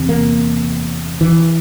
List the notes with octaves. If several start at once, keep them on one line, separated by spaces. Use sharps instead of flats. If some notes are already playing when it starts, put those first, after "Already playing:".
Already playing: E2 C3
A#3
E3